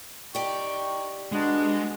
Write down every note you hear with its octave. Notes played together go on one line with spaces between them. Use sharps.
D#4 G4 D5 G5 C#6
G#3 B3 D4 F#4 D#5